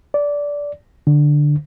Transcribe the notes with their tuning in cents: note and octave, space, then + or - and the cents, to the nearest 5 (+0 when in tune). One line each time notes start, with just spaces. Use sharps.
D5 -15
D3 +5